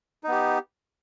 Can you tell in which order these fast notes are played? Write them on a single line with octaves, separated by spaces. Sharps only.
D#4 B3 G4